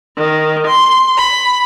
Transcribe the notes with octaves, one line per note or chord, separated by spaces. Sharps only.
D#3
C6
B5